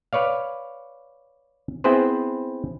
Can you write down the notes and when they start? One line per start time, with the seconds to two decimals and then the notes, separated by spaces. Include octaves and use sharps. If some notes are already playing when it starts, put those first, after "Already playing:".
0.13 B4 C#5 D5 F5
1.84 B3 C4 E4 G#4 B4 C5